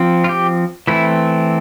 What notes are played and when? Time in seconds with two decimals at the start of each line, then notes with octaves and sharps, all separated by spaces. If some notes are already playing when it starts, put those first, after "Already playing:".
Already playing: F3 C4
0.24 F4
0.29 G4
0.87 E3 A3 C4 E4